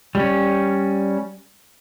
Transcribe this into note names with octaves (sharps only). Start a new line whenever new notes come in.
G3 C#4